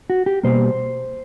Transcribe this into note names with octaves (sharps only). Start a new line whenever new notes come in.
F#4
G4
B2 G3 A#3 C5